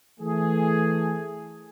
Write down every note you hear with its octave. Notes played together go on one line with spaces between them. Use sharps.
E3 A3 G#4